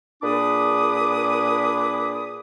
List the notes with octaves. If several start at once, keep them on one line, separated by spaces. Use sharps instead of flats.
A#2 D4 G#4 B4 D6 D#6